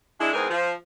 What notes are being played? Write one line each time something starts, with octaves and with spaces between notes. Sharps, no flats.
G#3 D4 E4
E2 G#2 C4 G#4 A#4 B4
F3